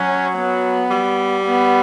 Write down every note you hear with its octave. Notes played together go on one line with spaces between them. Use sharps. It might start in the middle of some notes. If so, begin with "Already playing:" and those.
Already playing: F#3 C#4
B3
G3
B3